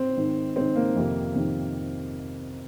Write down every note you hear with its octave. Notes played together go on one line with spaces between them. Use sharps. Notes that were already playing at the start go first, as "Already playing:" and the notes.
Already playing: C4
G#2 D#3
G#2 D#3 C4
A#3
F2 C3 D#3
F2 C3 D#3